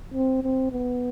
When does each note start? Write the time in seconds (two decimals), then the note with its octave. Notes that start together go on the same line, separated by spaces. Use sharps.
0.14 C4
0.44 C4
0.72 B3